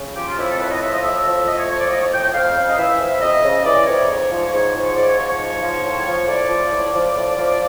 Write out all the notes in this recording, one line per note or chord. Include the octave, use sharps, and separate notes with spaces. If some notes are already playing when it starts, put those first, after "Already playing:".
Already playing: C#3
F3 G4
F4
F2 E4
A4
A2 B4
D#5
F3 E5
D#5
A2 E5
F3
A2 D#5
C#5
F3 C#5
D5
A2 D#5
C#5
F3 G5
G5
F2 F5
C#3
D#5
E3 E5
F2
E5
F2 D#5
C#3
E3 D5
F2 C#5
G#2
F3
G#2 C#5
F3
G#2 D5
C#5
F3 C#5
C#5
G#2
F3
A2
F3
A2 D5
F3
A2
F3
A2
F3